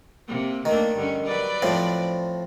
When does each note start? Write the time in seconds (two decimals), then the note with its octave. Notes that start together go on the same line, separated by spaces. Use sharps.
0.28 C3 A#3
0.65 D#3 A3 A#3 D4
0.96 G2 D3 C#4
1.25 F#3 B4 D5
1.62 A2 F3 C4